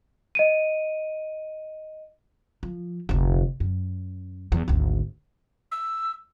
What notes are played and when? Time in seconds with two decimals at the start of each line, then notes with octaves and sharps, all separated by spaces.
0.35 D#5 D7 D#7
2.63 F3
3.09 F1 D2
3.60 F#2
4.52 E2
4.68 G#1 D2
5.72 E6